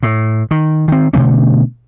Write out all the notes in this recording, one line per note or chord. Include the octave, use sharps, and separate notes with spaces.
A2
D#3
D#3 C4
B2 D3 A3 C#4